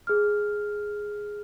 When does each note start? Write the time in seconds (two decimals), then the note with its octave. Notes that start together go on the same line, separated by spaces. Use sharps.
0.07 G#4 F6